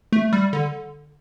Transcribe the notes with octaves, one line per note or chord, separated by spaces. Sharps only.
A3
G3
D3